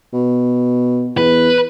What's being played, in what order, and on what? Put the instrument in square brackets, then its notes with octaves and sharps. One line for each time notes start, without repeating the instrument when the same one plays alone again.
[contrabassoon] B2
[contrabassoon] E2 [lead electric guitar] B4